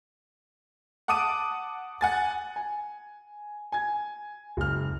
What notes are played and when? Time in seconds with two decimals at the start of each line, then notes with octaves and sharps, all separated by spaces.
1.08 F#5 A5 D6 D#6 D7 D#7
2.01 F#5 G#5 A6
2.56 G#5
3.72 G#5 G#6
4.57 F#1 C#2 F6